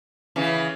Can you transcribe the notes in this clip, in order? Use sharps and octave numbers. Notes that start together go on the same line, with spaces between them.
C#3 E3